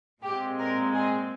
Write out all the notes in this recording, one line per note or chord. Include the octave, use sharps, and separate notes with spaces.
A#2 G#3 C4 G4
A#4
G#4